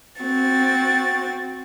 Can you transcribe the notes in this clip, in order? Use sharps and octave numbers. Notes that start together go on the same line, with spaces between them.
C4 F#4 A6